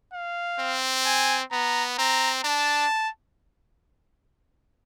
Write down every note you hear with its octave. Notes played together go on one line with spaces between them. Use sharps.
F5
C4
G#5
B3 A#5
C4 A#5
D4 A5